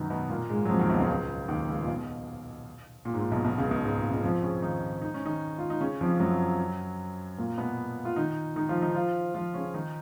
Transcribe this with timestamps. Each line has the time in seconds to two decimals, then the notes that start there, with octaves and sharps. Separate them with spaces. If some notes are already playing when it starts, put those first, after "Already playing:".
Already playing: F#2 B2 D#3 F#3 B3 D#4
0.10 B2 B3
0.30 A#2 A#3
0.49 G#2 G#3
0.65 F#3
0.69 F2 F3
0.79 D#2 D#3
0.89 B1 B2
0.98 C#2 C#3
1.48 D#2 D#3
1.68 C#2 C#3
1.81 A#2
1.88 B1 B2
3.05 A#2
3.13 G#2
3.19 A#2
3.31 B1 B2
3.45 B1 B2
3.58 C#2 C#3
3.71 B1 B2
3.84 G#2
3.97 A#2
4.10 C#2 C#3
4.23 F2 F3
4.43 C#3 C#4
4.62 D#3 D#4
5.02 D#4
5.14 C#4
5.25 D#3 D#4
5.58 F4
5.70 D#4
5.81 C#3 C#4
6.01 F2 F3
6.19 F#2 F#3
7.38 A#2 A#3
7.58 B2 B3
8.05 F4
8.16 D#3 D#4
8.56 D#3 D#4
8.69 F3 F4
8.82 D#3 D#4
8.95 F3 F4
9.34 F3 F4
9.54 C#3 C#4
9.74 D#3 D#4